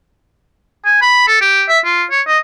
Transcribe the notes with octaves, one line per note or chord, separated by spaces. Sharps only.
G#5
B5
A4
G4
E5
F4
C#5
D#5